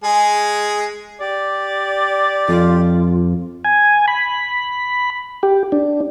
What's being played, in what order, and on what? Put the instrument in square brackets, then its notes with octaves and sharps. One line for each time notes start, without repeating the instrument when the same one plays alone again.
[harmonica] G#3 G#4
[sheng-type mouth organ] G4 [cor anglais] D5
[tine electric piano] F2 [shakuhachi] F4
[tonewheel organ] G#5
B5
G4
D4